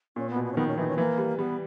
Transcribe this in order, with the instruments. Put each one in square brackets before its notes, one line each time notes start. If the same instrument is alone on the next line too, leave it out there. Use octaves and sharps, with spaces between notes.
[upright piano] A#2 [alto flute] C#4
[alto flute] B3
[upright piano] B2
[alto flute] B3
C#4
[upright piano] D#3 [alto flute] B3
[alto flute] C#4
[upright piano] E3 [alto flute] D#4
[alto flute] C#4
[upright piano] E3 [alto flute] A#3
[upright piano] G3
[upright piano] G3 [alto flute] B3